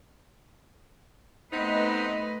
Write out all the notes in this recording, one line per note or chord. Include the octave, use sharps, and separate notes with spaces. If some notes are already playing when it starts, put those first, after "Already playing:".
A3 B3 C4 D#4 B4 D#5